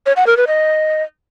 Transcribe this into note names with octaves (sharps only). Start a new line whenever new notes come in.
C#5
F#5
A#4
B4
D#5